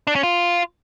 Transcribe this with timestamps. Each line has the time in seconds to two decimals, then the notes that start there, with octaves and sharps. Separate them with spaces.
0.07 D4
0.15 C#4
0.23 F4